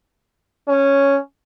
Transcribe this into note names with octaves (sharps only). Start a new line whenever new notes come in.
C#4